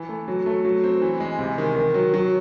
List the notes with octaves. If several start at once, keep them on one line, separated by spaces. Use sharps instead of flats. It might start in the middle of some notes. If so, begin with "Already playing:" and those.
Already playing: E3
A3
F#3
A3
F#3
C4
E3
G#3
C3
D#3
D#3
F#3
F#3